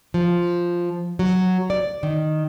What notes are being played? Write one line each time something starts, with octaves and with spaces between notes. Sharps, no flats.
F3
F#3
D5
D#3